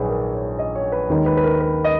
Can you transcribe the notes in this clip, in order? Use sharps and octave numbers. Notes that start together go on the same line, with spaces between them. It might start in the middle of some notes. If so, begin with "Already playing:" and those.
Already playing: A#1 G#2 D#3 F#3 G#4 B4 C#5
A#4
C#5
D#5
C#5
B4
D#2 D#3 G#3 C#5
B4
B4
A#4
B4
D#5